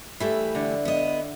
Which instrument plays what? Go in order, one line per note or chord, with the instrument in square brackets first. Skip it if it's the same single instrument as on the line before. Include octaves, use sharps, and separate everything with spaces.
[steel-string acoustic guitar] E3 G3 A3 [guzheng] E4
[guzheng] D3
[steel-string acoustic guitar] B3 D#5